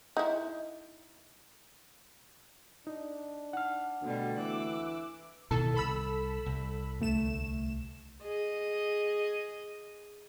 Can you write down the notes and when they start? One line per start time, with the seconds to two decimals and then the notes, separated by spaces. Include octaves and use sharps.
0.17 D#4 E4
2.87 D4 D#4
3.53 F#5 F6
4.02 D2 B2 D3 G3
4.38 E3 D6 E6 F#6
5.51 B2 D#3 E3 A4
5.74 C2 A4 B5 E6
6.46 C2
7.00 D2 A3 E7
8.21 G#4 D#5